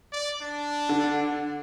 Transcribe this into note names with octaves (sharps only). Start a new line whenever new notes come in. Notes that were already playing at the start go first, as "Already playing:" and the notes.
D5
D4
D3